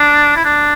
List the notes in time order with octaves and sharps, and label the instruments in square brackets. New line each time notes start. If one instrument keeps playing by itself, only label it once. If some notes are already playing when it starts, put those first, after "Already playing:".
Already playing: [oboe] D4
E4
D4